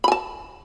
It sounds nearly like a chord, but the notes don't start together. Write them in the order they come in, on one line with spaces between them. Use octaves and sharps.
B5 G#5 A5